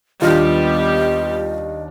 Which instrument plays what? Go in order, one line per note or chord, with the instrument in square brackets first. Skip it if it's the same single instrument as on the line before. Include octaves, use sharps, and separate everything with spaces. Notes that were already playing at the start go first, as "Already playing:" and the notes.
[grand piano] D#2 D4 F6 [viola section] G3 B3 G4 [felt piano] F4 [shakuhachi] D#5